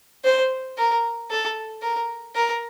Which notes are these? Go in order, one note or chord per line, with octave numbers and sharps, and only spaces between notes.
C5
A#4
A4
A#4
A#4